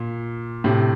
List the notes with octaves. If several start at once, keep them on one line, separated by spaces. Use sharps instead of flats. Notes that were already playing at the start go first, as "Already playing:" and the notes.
Already playing: A#2
A2 C3